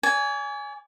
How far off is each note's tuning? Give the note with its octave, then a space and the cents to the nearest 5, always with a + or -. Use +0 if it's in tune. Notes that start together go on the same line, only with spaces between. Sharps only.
D5 -45 G#5 +0